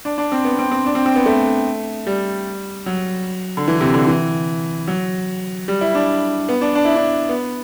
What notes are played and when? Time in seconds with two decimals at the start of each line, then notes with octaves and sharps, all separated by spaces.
0.05 D4
0.18 D4
0.32 C4
0.45 B3
0.59 C4
0.72 C4
0.86 D4
0.95 C4
1.06 C4
1.16 B3
1.26 A3
2.07 G3
2.86 F#3
3.57 D3
3.68 E3
3.81 C3
3.94 D3
4.07 E3
4.88 F#3
5.68 G3
5.81 E4
5.95 D4
6.49 B3
6.61 D4
6.75 D4
6.85 E4
6.96 D4
7.29 B3